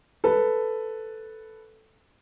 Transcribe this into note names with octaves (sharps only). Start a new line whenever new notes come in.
A4 B4